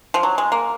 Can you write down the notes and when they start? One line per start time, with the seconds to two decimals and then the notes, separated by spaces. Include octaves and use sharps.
0.14 F3
0.23 F#3
0.38 G#3
0.52 A#3